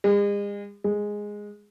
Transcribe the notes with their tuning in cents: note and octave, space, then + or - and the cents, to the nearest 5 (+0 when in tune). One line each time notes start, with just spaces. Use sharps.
G#3 -40
G#3 -5